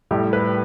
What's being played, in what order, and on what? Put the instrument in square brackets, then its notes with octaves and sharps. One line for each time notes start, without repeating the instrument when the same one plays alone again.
[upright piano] A2 G3 G4
B4